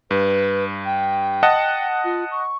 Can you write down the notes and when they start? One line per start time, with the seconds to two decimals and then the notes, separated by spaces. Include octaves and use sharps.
0.11 G2 B4
0.86 G5
1.43 D#5 F#5 A5
2.05 F4
2.31 C#6